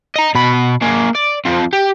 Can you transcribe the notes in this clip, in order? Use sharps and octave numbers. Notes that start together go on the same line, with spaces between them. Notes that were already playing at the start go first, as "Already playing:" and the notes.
D#5 A#5
B2 B5
A#3 G#4
D5
F3 C4
G4